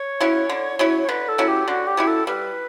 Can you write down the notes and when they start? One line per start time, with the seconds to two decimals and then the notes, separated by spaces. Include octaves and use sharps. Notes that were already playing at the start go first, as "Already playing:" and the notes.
Already playing: C#5
0.20 F#3 C#4 E4
0.49 D3
0.79 F#3 C#4 E4
1.02 C#5
1.09 D3 B4
1.28 A4
1.38 F#3 C#4 E4
1.48 G4
1.68 D3 F#4
1.87 G4
1.97 F#3 C#4 E4
2.07 A4
2.27 G3 B4